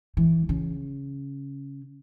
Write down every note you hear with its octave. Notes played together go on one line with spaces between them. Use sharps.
E3
C#3